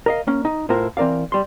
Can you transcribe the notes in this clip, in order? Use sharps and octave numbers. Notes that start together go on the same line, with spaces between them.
A#4 D#5 F5
A#3 C#4
D#4
A2 E4 F4 A#4 C5
E3 C4 A#4 D5 F5
G3 C6